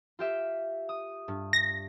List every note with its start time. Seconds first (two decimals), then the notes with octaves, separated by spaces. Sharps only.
0.19 F4 G4 E5
0.89 D#6
1.28 G2
1.53 A#6